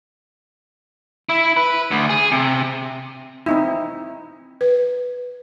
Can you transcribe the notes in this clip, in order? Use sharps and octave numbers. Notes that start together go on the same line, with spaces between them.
E4
B4
D2
G#4
C3
C4 D#4 E4
B4